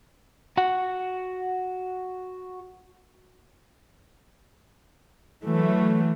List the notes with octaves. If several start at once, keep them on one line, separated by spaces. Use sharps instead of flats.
F#4 F#5
E3 F#3 A3